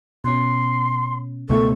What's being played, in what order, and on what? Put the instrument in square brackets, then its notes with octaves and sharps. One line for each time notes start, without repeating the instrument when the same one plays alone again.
[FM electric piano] B2 C#4 [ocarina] C6
[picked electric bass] C#2 B2 A3 [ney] A4 [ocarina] C#6